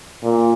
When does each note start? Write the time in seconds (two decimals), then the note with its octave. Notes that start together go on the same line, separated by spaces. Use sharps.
0.24 A#2